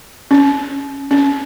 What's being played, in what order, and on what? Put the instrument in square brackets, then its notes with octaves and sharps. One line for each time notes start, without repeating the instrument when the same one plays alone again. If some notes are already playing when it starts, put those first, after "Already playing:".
[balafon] C#4
C#4